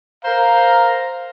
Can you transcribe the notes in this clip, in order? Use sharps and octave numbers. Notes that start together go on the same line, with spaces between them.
A#4 C5 F5 A#5